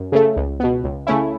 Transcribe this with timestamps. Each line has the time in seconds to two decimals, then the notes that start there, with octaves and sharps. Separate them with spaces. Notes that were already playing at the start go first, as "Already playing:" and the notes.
Already playing: F#2
0.12 C#3 A3
0.37 C#2
0.60 B2 B3
0.84 C#2
1.07 C#3 A3 C#4 E4